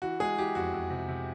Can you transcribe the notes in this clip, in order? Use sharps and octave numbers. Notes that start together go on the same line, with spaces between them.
E3 F#4
G#3 G#4
E3 G4
F2 F#4
F2
C3
C3